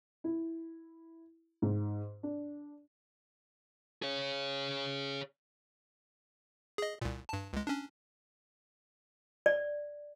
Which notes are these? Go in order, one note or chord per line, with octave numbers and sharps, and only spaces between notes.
E4
G#2
D4
G#4 C#5
G#4 D#5
C2 A#2
G2 A5
C#2 G#3
C#4 D4
D5